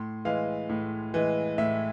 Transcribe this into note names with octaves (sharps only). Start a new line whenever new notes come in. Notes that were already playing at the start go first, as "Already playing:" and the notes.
Already playing: A2 C6
E3 G#3 F5
A2
E3 G#3
A2 E5